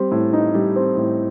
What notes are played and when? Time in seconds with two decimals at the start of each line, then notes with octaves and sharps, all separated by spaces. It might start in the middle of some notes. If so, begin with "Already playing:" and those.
Already playing: G3 C4
0.11 A2
0.33 D#4
0.55 G3
0.76 C4
0.97 A2